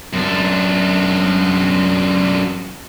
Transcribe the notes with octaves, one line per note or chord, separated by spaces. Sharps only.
F#2 D4